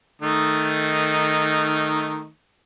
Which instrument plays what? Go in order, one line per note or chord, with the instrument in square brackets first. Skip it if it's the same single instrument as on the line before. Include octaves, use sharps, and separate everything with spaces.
[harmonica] D#3 A3 D#4